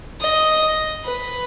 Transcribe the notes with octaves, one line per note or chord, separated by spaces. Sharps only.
D#5
B4